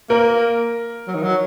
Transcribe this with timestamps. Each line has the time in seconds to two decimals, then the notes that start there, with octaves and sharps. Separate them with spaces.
0.10 A#3 A#4
1.08 F#3
1.15 D#3
1.23 F#3